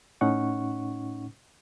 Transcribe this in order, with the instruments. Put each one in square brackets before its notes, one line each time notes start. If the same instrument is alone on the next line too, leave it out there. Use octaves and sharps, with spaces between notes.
[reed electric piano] A2 C#4 D#4 F#5 C#6